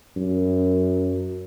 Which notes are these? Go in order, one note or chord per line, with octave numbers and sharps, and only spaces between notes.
F#2